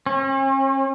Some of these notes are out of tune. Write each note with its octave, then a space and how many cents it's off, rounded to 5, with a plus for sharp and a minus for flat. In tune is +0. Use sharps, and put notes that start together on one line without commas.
C#4 -45